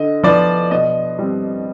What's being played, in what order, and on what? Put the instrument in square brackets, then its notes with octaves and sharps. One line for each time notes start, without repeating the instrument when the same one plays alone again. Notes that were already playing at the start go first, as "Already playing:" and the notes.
Already playing: [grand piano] D3 D#5
F3 B3 D5
B2 D#5
G3 C4